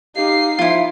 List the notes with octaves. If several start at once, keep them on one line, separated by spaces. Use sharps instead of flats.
D#4 G4 F5 C7
F3 E4 F4